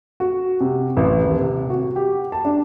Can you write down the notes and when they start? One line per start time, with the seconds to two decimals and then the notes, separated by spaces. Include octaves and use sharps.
0.20 F#4
0.61 C3
0.97 A1
1.25 D#1
1.39 C3
1.70 F#4
1.96 G4
2.32 A5
2.45 D4